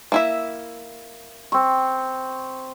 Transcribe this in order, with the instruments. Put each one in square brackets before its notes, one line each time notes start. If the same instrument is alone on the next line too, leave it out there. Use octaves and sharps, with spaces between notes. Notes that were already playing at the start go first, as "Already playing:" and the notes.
[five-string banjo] A#3 E4 E5
[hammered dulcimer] C4 C#6